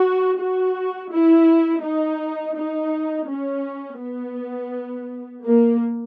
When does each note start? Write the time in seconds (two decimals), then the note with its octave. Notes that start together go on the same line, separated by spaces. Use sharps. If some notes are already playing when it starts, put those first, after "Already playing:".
Already playing: F#4
0.39 F#4
1.12 E4
1.84 D#4
2.56 D#4
3.28 C#4
4.00 B3
5.45 A#3